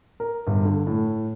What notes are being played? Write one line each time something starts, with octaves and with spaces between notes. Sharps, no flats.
A#4
G1
D3
A2